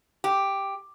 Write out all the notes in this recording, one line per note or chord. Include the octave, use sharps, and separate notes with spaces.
G4